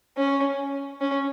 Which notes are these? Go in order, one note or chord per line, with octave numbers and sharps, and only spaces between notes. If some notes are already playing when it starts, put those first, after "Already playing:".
C#4
C#4